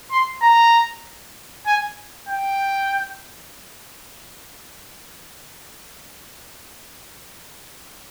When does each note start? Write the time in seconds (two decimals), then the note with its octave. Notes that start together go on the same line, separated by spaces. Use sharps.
0.11 C6
0.43 A#5
1.67 G#5
2.29 G5